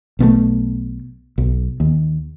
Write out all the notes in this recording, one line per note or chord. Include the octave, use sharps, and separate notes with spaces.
B1 B2 D3 A3
B1
D#2